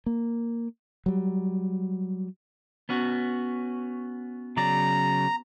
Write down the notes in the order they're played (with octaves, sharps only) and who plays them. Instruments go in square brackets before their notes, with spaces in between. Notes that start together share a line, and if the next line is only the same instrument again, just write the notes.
[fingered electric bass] A#3
F#3 G3
[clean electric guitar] B3 C#4 F#4
[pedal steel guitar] C#3 F#3 D5 [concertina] A#5